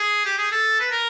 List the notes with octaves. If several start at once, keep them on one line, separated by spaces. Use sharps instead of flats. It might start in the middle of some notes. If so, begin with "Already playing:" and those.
Already playing: G#4
G4
G#4
A4
B4
A#4